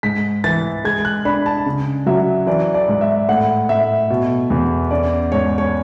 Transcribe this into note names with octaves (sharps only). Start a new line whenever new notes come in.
G#2 B6
E3 A6
G#3 G#6
F#6
D4 B5
A5
C#3
F#3 E5
E3 D5
D5
G#2
E5
A2 F#5
A2 E5
B2
E2
C#4 D5
G#2 C#5
C#5